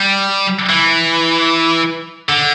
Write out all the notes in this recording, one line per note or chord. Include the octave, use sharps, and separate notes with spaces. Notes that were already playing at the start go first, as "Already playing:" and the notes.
Already playing: G3
E3
D3